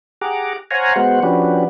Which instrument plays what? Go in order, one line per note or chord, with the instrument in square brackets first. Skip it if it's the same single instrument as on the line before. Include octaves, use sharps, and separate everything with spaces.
[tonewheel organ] G4 G#4 F#5 A#5 D6
C5 C#5 F5 F#5 G#5 A#5
G#3 B3 F#4 C5 F#5
F3 C#4 D4 F#4 G4 B4